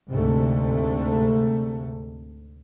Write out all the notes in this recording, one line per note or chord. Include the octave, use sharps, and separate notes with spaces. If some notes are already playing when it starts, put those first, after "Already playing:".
D2 G#2 C3 A3